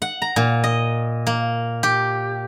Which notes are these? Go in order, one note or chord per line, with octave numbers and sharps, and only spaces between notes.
F#5
A#5
A#2
D#5
A#3
G4